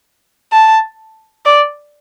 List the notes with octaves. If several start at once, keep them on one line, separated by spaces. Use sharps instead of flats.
A5
D5